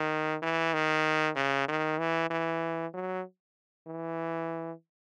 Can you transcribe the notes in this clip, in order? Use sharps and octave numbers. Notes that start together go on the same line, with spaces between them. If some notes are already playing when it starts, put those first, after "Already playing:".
Already playing: D#3
E3
D#3
C#3
D#3
E3
E3
F#3
E3